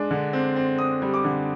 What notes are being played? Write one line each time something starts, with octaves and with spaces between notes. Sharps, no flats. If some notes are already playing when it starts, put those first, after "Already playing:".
Already playing: G#3 D4
D3
C4
C4
C4 D#6
G3
D6
D3